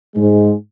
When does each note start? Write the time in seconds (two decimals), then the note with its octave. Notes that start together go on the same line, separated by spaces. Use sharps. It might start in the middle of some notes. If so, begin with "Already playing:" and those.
0.16 G#2 G#3